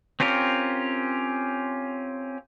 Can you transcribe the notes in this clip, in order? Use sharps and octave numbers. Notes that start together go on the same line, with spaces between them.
C4 C#4 F4 G4 A#4